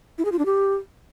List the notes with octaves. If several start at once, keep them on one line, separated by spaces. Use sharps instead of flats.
E4
G#4
F4
D4
G4